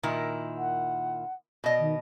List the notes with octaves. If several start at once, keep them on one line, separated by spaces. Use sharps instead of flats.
A#2 D#3 E4
F#5
B2 D#5
D#3